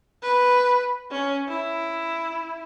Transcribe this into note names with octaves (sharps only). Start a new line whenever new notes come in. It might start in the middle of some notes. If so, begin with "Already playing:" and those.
B4
C#4
E4